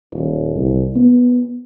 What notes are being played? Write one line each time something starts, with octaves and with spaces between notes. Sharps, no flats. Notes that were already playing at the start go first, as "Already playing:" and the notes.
D#1
C2
B3